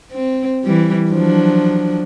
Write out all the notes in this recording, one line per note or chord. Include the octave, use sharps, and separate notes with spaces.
C4
E3 G3
F3 F#3 D4